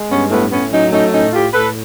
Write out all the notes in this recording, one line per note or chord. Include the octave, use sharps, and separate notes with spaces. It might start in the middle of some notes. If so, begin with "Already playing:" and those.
Already playing: G#3
G2 B3 C#4
A2 A3 B3
A2 B3 C#4
F#3 C#4 D#4
A3 C#4 D#4
A2 C#4 D#4
A2 F4 G4
A2 A4 B4